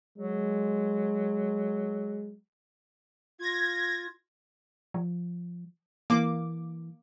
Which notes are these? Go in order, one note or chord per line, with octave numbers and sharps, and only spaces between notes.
F#3 G#3
F4 G#6 A#6
F3
E3 A#3 D6